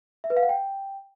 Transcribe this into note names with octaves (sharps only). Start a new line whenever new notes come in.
E5
B4
F5
F#5
G5